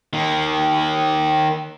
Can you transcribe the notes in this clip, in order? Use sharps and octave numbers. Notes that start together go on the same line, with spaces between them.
D#3 A#3